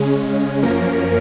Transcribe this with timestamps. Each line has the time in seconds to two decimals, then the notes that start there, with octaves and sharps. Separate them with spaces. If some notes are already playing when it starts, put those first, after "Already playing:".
Already playing: C#3 G#3 C#4
0.62 F#2 F3 A#3 C#4 A#4